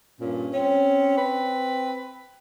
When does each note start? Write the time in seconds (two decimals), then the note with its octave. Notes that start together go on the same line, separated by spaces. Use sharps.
0.20 G2 A#2 C#4
0.53 C4 C#4
1.17 B4